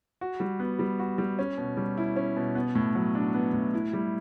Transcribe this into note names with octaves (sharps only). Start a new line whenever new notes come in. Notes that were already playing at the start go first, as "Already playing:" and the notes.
F#4
G3
B3
G3
F#4
G3
C#4
B2
G3
E4
C#4
B2
B3
A2
F#3
D4
B3
A2
E4
G3